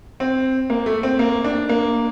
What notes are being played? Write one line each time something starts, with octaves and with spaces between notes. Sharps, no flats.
C4
A#3
A3
C4
A#3
D4
A#3